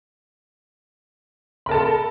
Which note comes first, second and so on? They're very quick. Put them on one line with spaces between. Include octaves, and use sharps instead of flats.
B5 A#4 A5 A4